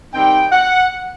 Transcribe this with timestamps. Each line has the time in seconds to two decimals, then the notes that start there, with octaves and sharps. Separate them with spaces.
0.13 D#3 G3 C4 D#4 G5
0.52 F#5